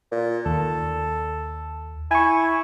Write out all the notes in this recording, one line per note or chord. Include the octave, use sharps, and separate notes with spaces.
A#2
D#2 A4
E4 G#5 C#6